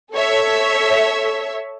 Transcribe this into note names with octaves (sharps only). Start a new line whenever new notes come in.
A4 C#5 E5